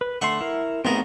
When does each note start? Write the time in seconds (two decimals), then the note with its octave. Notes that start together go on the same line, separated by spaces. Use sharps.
0.01 B4
0.21 D3 A3 E5 F#5 C6 C#6
0.41 E4 A#4
0.85 A1 B3 C4 D#4 G#4 A#4